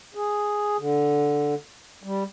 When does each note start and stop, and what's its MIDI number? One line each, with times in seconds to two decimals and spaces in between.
0.15 0.77 68
0.78 1.54 50
2.03 2.24 55